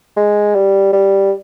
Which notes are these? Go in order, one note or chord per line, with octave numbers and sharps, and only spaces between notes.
G#3
G3
G3